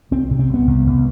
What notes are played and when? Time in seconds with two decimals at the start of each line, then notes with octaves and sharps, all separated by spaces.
0.11 C2 C4
0.31 C3
0.39 C4
0.49 C2 B3
0.67 C2
0.87 C2